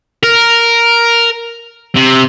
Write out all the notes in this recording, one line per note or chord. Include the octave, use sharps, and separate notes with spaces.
A#4
C3